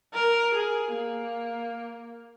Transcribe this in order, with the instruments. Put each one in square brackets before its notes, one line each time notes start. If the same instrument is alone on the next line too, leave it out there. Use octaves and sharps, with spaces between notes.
[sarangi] A#4
G#4
A#3